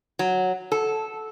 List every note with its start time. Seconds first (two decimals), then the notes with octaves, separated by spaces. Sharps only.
0.19 F#3
0.72 A4